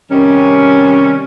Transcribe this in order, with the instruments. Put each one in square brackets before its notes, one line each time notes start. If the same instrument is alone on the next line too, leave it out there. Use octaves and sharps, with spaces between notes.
[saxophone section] C3 D#3 G3 C#4